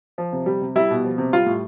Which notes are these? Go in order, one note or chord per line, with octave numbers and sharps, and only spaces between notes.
F3
C3
G3
C3
G3 E4
B2
F3
C3
G3 F4
A2